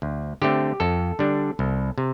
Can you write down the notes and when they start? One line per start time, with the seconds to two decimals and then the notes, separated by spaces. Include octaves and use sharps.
0.02 D2
0.42 D3 A3 C4 G4
0.80 F2 A4
1.19 D3 G3 D4
1.59 C2
1.98 C3